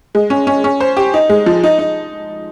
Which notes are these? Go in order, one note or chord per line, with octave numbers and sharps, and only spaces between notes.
G#3
C#4
C#4
C#4
C5
G4
D#4
G#3
F3
D#4
D#4